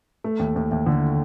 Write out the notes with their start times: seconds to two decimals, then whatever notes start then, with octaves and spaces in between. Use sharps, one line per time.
0.24 A3
0.39 D#2
0.56 D#2
0.72 D#2
0.86 D3